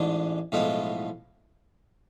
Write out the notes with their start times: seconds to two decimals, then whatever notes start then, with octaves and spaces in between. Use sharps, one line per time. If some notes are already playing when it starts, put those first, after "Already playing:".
Already playing: A1 G#2 G#3 D4
0.52 B1 A2 F3 G#3 B3